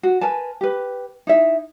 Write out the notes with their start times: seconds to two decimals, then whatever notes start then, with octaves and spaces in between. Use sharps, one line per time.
0.03 F#4
0.21 A#4 B4 G#5 A5
0.61 G4 B4
1.27 D#4 E4 E5